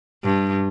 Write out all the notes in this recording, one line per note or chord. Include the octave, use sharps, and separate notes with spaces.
G2